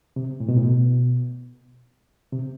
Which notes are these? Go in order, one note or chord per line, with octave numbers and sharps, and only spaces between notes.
C3
A2
B2
A2
B2
C3